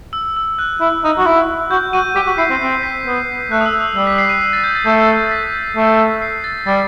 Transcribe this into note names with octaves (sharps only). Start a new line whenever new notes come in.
E6
E6
F#6
E4
D#4
F#4
E4
F#4 G6
F#4 D#7
G4 B6
F#4
B6
E4 C7
C4
C4 C7
B6
B3
A3 F#6
D#6
E6
D#6
G3 E6
B6
C7
D#7
C7
A6
G6
A6
A3 G6
A6
B6
A3
C7
A6
G3 A6